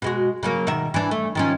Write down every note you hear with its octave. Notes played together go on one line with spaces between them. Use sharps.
B2 G#3 F#4
C#3 F#3 A#3
B2 D#3 E5
E3 D4
A3
D#3 F3 C#4